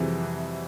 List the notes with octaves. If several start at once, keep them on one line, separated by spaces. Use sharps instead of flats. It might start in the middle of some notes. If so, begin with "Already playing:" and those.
Already playing: F2 C3 E3 G3 F#4 G#4